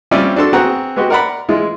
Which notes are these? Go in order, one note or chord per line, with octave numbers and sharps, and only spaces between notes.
G3 C4 C#4 F4 D5 E5
D4 F#4 A4 C6
B3 C4 F#4 G#4 F#5 A#5
G#3 B3 F#4 G4
A#4 D5 F#5 A#5 B5
E3 G#3 E4 F4